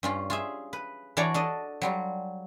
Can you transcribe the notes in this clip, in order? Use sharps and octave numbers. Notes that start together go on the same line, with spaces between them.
G2 C#4 F4
F4 G#4 E5
B4
E3 D4 F#4 C#5 D5 A#5
D4 A4 D#5
F#3 G3 F4